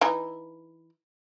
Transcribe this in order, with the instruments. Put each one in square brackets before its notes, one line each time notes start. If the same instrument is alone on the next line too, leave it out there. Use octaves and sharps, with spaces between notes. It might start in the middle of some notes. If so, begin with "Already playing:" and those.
[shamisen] E3 D#4